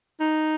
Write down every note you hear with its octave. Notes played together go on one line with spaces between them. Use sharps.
D#4